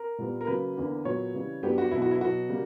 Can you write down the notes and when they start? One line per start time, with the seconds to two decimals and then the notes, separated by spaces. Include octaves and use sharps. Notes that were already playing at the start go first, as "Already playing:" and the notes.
Already playing: A#4
0.18 A#2 G3 B3
0.41 A#4
0.47 C#3 F#3 A#3 B4
0.77 E2 D3 A#3
1.05 A#2 F#3 B3 C#5
1.34 C#3 E3 G3
1.63 G2 F#3 B3 G4
1.78 F#4
1.91 E2 B2 F#3 E4
2.02 F#4
2.11 E4
2.21 B2 F#3 B3 F#4
2.49 C#3 G3 A#3